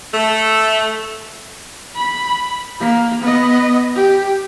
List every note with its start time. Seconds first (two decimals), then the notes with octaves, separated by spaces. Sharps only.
0.13 A3
1.95 B5
2.79 A#3
3.22 B3 D#5
3.95 G4